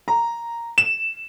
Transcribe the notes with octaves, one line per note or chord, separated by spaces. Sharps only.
A#5
E7